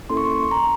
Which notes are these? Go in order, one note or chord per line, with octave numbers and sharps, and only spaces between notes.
A#3 C#4 E4 A4 C6
C#6
C6
A#5